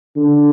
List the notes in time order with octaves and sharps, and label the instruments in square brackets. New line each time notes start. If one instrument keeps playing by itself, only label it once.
[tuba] D3